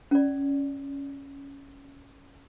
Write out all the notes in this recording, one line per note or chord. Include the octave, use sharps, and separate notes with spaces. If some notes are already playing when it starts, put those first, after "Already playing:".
C#4 D5